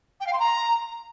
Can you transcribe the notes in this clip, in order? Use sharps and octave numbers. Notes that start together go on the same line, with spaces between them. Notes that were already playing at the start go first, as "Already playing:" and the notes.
G5
F5
C6
A#5